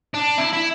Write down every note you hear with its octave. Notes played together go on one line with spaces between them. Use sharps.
D4
E4
E4